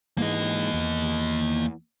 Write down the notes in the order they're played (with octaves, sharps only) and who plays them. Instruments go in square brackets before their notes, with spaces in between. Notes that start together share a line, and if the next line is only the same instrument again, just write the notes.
[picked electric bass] G#2 E3 G#3 [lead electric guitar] A#3 D#5
[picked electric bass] E2